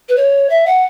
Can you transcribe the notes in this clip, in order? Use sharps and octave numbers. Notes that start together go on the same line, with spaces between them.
B4
C#5
E5
F#5